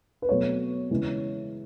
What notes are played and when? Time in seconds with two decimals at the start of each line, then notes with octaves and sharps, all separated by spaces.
0.22 B4
0.29 B2 F#3 A3 C#5
0.90 C#3 E3 G#3